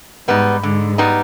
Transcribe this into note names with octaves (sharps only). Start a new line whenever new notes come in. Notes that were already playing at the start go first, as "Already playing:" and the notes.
G#2 G3 B3 D#4
G#2 D3
G3 B3 D#4